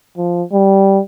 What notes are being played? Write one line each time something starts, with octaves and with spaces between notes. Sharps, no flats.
F3
G3